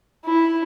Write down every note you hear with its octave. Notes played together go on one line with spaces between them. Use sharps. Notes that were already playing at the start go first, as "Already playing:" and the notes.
E4